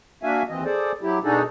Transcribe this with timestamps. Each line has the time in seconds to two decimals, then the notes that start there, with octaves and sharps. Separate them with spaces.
0.23 A#3 D4 F#4 E5 F5 G#5
0.49 D#2 E3 C4 D#5
0.64 G#4 A4 C5 D5
1.02 F#3 E4 G4
1.23 B2 D4 D#4 F#4 G#4 A4